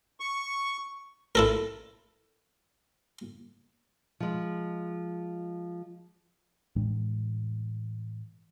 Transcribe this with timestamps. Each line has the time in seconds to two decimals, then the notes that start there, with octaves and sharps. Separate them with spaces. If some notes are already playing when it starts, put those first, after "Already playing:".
0.20 C#6
1.35 E4 A4 A#4
4.20 F3 G#3
6.76 A2 E3 G#3 D4